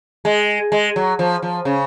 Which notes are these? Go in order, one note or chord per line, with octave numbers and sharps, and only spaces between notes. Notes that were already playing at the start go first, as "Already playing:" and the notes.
G#3
G#3
F#3
F3
F3
C#3